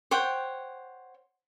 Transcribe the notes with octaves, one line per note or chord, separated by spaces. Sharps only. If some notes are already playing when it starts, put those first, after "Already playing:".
C5 C#5 F#5 G5